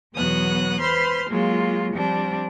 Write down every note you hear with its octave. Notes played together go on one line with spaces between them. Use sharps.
E2 B2 F#3 B3 D#6 F#6
B4 C5 B5 C6 F6
F#3 G#3 A#3 F4
F3 G3 C4 D4